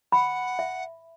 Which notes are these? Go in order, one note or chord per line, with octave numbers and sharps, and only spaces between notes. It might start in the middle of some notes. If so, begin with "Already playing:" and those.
F#5 B5
E5